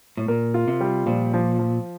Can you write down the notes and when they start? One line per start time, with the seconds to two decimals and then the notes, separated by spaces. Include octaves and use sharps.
0.17 A2
0.28 A#2 A#4
0.54 F4
0.68 C3
0.80 G3
1.06 A#2 F3
1.33 F3
1.59 F3